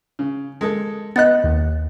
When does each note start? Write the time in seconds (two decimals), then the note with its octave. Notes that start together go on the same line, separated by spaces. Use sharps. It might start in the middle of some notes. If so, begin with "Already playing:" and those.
0.19 C#3
0.61 G#3 A#3 A4
1.16 B3 D#5 F#5 F#6 A6
1.44 D#2